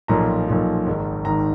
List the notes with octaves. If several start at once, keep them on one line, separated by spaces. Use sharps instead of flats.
B1 A#2 F3 A#5
B1 A#2 F3
G#1 G#2 D#3
G#1 G#2 D#3 A#5